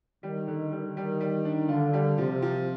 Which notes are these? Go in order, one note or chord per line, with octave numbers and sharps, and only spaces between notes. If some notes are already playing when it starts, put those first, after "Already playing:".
D#3 G3
D3
D#3 G3
G3
G3
D4
D3 F4
G3
C3 F3
F3